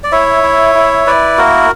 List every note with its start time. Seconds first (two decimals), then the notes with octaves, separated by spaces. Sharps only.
0.04 D5
0.12 E4 C#5 E5
0.43 E4
0.75 E4
1.07 E4 B4 D5
1.38 A#3 F#4 A#4